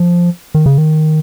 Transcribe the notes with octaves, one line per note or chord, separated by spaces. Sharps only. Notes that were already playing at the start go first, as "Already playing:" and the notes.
Already playing: F3
D#3
C#3
D#3